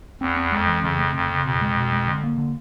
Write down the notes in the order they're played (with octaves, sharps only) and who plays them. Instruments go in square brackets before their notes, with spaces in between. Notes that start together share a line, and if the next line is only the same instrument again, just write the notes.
[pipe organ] E2 [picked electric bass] C4
[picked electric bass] C4
[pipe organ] F2 [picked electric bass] G#3
[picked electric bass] E3
[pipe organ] F2 [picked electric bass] C#3
[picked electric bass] A3
[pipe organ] F2 [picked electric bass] C#3
[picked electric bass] C#3
[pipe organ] F2 [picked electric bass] B2
[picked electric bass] G#3
B2
G#3
D3
A#3
D3